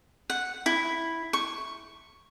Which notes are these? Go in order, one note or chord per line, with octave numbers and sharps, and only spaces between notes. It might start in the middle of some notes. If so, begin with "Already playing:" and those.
F#5
E4
C#6